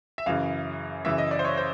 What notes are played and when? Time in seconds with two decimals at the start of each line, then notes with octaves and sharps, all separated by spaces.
0.18 E5
0.26 F#2 C#3 E3 F5
1.05 F#2 C#3 E3 E5
1.18 D#5
1.31 D5
1.39 C5
1.45 C#5
1.57 C5